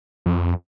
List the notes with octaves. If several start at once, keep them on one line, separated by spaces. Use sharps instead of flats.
F2